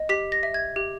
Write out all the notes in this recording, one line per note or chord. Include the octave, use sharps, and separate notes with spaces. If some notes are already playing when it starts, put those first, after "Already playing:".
Already playing: D#5
G4 B6
A#6
E5
G#6
G4